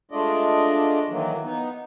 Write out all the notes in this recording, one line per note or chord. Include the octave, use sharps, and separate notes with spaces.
G#3 A3 D4 F4 D5 D#5
D#3 E3 F#3 A#3
B3 D#4